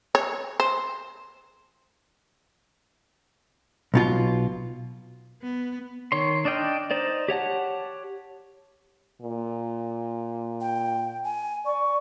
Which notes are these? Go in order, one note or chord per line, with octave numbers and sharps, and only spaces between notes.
C#5
C5
B1 B2 F4
B3
D#3 C#5 C6
D4 D5 D#5 G5 F6
D#4 C5 D5
G4 C#5 F#5 A5
A#2
G5
G#5
D5 C#6